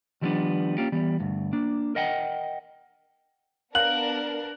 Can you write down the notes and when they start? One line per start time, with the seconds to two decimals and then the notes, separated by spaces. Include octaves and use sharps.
0.21 D#3 F3 G3 A#3 B3 D4
0.78 A#3 C#4 F4 G4
0.92 E3 G3 B3
1.20 D2 G2
1.53 A#3 D4
1.95 A#4 D#5 F#5 G5
3.75 B3 D4 A#4 F5 F#6 F#7